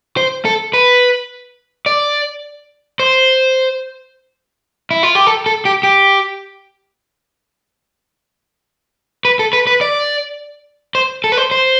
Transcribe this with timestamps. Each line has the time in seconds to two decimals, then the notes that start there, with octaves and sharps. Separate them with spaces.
0.17 C5
0.45 A4
0.73 B4
1.86 D5
3.00 C5
4.91 E4
5.03 F4
5.15 G4
5.27 A4
5.46 A4
5.65 G4
5.83 G4
9.25 B4
9.39 A4
9.53 B4
9.67 B4
9.81 D5
10.95 C5
11.24 A4
11.32 B4
11.37 C5
11.51 C5